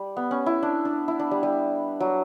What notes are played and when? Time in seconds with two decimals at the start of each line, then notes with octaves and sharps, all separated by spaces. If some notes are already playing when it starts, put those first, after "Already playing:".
Already playing: G3
0.17 B3
0.31 C#4
0.46 E4
0.63 D4
0.85 D4
1.08 E4
1.19 D4
1.31 G3
1.43 G3
2.00 F#3